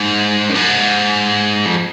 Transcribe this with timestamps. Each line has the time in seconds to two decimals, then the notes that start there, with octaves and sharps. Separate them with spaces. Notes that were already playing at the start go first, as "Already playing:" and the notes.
Already playing: G#2
0.49 F#2
0.55 G#2
1.65 F2